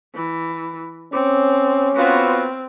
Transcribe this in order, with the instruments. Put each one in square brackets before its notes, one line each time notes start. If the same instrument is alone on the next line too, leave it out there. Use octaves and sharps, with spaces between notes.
[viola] E3
[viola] C4 [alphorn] C#4 [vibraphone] C#5 D6
[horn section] B3 F4 F#4 [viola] C4